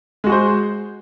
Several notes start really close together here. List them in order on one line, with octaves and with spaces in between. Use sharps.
G#3 F#4 G#4 C5